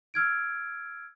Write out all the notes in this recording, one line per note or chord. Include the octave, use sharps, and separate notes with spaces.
E6 F6 G#6 D7